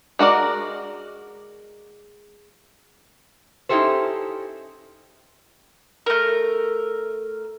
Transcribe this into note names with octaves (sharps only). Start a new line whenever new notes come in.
G#3 F#4 A#4 D5
C#4 D#4 E4 G4 A4 C5
A3 A#4